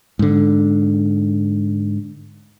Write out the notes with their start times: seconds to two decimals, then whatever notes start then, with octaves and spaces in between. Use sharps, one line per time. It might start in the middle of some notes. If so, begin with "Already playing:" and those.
0.19 G#2 D3